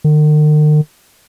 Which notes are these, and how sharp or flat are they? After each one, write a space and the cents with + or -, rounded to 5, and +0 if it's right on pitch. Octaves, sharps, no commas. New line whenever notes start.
D#3 -45